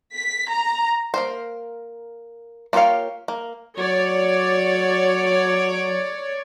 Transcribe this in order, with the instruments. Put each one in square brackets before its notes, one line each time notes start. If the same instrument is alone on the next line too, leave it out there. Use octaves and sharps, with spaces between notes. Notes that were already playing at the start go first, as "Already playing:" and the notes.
[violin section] B6
A#5
[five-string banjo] A#3 A#4 C5
A#3 F4 G4 C#5 F5
A#3
[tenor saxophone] F#3 [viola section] C#5 D5